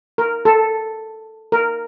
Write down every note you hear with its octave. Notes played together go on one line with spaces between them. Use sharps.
A#4
A4
A#4